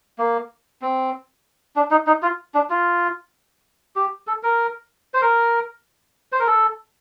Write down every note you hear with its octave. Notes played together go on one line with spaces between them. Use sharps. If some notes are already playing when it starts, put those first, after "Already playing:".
A#3
C4
D4
D#4
D#4
F4
D4
F4
G4
A4
A#4
C5
A#4
C5
A#4
A4